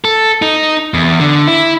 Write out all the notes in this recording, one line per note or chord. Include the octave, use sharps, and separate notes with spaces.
A4
D#4
E2
D3
E4